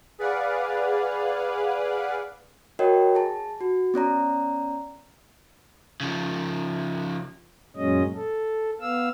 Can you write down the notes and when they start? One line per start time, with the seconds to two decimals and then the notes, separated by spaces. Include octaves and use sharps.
0.19 G#4 B4 D5 F5 F#5
2.79 F#4 A#4 C#5 D#5 G5
3.15 G#4 A5
3.61 F#4
3.94 B3 C#4 D5 A#5
6.00 C#3 F3
7.76 F#2 A#2 F#3 G#3 C#4 D#5
8.16 A4
8.81 B3 F5 E6